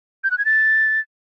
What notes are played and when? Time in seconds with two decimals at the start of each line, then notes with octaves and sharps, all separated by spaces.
0.24 G6
0.31 F#6
0.38 G#6
0.45 A6